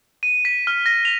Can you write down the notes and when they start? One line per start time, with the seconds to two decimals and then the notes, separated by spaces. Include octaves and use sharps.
0.23 D#7
0.45 B6
0.67 F6
0.86 A#6
1.05 F7